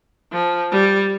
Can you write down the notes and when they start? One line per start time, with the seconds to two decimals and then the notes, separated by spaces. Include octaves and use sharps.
0.32 F3
0.72 G3